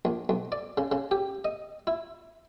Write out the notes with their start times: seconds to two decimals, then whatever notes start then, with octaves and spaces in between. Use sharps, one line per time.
0.05 A#1
0.29 B1
0.52 D5
0.77 C#3
0.92 C#3
1.11 G4
1.45 D#5
1.87 E4